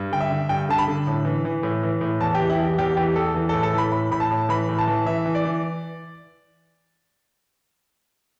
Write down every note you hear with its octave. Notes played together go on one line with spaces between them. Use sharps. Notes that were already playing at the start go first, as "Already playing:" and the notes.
Already playing: G2
D3 G5
E5
D3
G2 G5
D3 A5
B5
D3
A2
E3
E3
A2
E3
A2
E2 A5
G4
E3
E4
E2 G4
E2 G4
E3 G4
E2 A4
E3
A2 A4
A4
E3 B5
A2 B5
A2 B5
A5
A2
E3 B5
A2
A5
E3
E3 E5
E3
D5
E3